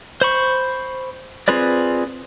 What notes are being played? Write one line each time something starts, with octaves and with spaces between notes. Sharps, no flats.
C5 B5 C#6
C4 F4 G#4 B4 D5